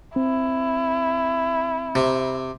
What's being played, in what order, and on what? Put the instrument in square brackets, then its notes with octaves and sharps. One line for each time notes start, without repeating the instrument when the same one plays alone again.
[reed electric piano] C4 [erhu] E4
[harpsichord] C3